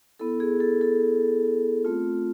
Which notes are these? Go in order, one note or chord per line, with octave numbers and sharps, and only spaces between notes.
B3 E4 A4
G#4
A4
A4
A3 C4 F4